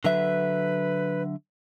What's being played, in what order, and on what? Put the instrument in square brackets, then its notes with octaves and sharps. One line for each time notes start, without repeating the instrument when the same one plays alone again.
[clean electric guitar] D3 F#3 E5 [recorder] B4